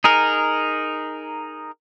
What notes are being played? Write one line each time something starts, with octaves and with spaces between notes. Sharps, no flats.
D#4 G#4 A#4